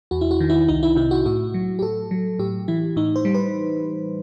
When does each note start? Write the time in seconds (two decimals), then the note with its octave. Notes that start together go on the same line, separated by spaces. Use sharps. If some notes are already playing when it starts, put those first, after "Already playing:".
0.11 E2 F#4
0.21 E4
0.31 F#4
0.40 D#3
0.50 E4
0.68 C2 D#4
0.83 E4
0.96 C3 E4
1.11 F#4
1.26 A2 F#4
1.54 F#3
1.79 G4
1.82 A2 A4
2.11 F#3
2.39 A2 G4
2.68 E3 E4
2.96 A2 D#4
3.16 C5
3.25 G3
3.34 B4